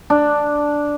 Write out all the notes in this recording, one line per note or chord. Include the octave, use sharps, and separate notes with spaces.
D4